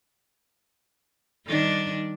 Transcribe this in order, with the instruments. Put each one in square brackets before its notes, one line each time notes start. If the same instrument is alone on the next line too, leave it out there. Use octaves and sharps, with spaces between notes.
[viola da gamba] D#3 G3 D4